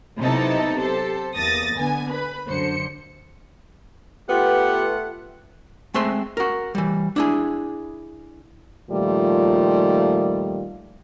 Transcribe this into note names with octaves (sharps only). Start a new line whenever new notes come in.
C3 F#3 B3 D#4 E4 A4
G4 A4 C5
E2 A#3 D#6 A6 A#6
D3 B3 G#5
B4 B5
F#2 D3 C5 C#7
A3 B3 F4 G4 B4 F#5
G#3 A3 C4 E5 C6
F#4 A#4
E3 G3
D4 E4 G#4
A#2 D#3 F3 G3 A3 F4